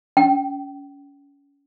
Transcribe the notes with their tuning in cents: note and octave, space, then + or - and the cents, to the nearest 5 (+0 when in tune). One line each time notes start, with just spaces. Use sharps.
C#4 +25 G5 -30